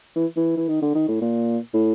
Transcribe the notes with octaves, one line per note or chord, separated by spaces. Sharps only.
E3
E3
E3
D#3
D3
D#3
A2
A#2
A2